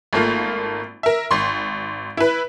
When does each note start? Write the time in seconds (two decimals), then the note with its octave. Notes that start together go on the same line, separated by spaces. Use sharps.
0.13 G#1 A3 A#3 F4
1.03 A#4 E5
1.31 G#1 C6
2.17 E4 B4